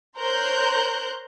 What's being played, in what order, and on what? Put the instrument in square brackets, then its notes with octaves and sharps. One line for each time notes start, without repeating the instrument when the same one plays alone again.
[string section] A#4 C5 C#5 A#5 F#6 G6